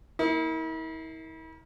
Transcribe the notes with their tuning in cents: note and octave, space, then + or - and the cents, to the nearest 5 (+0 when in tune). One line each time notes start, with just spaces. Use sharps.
A#3 +0 E4 -40